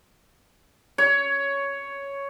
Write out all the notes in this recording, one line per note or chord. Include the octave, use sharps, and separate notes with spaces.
C#5